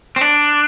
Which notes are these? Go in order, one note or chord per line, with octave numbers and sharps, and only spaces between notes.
C4
D4